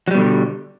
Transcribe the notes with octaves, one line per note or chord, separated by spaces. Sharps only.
B2 D3 F#3 G3